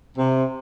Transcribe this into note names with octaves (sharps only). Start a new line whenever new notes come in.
C3